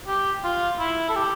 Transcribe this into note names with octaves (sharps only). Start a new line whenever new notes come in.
G4
F4
E4
A4
G4